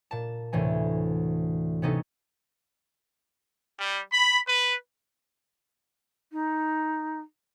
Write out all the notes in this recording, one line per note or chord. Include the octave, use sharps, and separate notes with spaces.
A#2 A5
D2 A2 C3 E3 G#5
C3 B3 C#4 D#4 A4
G3
B5
B4
D#4